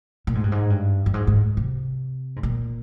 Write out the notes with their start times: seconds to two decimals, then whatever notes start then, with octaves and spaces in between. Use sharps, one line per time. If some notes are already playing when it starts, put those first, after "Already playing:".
0.27 A#2
0.35 G#2
0.44 G2
0.52 G#2
0.70 G2
1.06 G2
1.14 G#2
1.27 G#2
1.57 C3
2.36 G#2
2.43 A#2